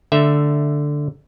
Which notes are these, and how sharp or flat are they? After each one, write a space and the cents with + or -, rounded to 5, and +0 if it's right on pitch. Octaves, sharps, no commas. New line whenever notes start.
D3 +0 A3 +0 E5 +0